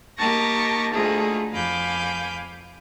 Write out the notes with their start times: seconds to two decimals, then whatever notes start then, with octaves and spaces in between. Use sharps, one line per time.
0.18 A#3 D#4 G4 A5 C#6 A#6
0.93 D2 A3 D#4 F4 G#4
1.52 F2 F5 G#5 B5 D6 G6